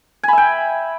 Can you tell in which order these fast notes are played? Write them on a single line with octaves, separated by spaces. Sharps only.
G#5 B5 E5 G5